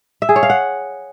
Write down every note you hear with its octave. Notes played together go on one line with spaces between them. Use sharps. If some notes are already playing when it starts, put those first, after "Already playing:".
E5
G#4
C#5
F5
F#5